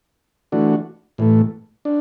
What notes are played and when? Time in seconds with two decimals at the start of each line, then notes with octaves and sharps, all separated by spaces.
0.52 E3 A3 D4 F#4
1.18 A2 E3 A3
1.85 D4